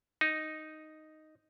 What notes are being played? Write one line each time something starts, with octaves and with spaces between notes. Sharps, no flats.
D#4